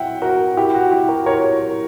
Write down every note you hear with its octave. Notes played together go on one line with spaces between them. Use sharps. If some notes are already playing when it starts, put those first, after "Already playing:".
Already playing: E5 F#5 G5
F#4 A#4
E4 G4
F#4
E4 G4
F#4 A#4
A#4 C#5